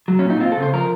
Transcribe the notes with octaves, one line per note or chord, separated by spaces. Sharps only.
F#3
C#4
A#2
D#4
C4 F4
A4
C#3
C5
F3 A#4